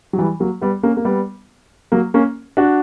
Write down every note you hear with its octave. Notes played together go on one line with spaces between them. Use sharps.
F#3
E3 G3
F#3 A#3
G3 B3
A#3 C#4
A#3
G3 B3
F#3 A#3
A#3 C#4
D4 F#4